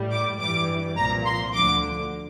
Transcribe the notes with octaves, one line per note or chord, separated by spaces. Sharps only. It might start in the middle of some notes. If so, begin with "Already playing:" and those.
Already playing: A2 G3
D6
G2 E3 G3 D6
C2 A#2 F3 A#5
C6
D2 D3 F3 D6